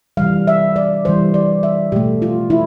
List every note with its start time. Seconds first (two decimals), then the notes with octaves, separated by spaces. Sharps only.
0.17 C3 E3 G3 F5
0.47 E5
0.76 D5
1.05 C3 E3 G3 C5
1.34 D5
1.63 E5
1.92 B2 A3 G4
2.22 F4
2.50 E4